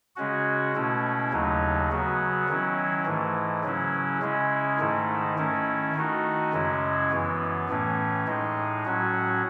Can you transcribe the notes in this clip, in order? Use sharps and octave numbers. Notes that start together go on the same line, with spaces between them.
C#3 G#3 C#4 F#4
B2 A3 C#4 E4
D#2 C#3 F#3 A3 D#4
C#3 F#3 B3 F#4
D#3 F#3 C#4 E4
G#2 E3 A3
C#3 F#3 C#4 E4
C#3 G#3 C#4 E4
G#2 D#3 A3 E4
D#3 A3 C#4 E4
D#3 A3 D#4 F#4
F#2 C#3 G#3 C#4 E4
F#2 E3 B3
A2 E3 A3 C#4
A2 G#3 D#4
A2 F#3 C#4 F#4